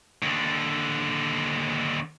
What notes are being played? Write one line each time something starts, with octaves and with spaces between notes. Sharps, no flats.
D#2 D3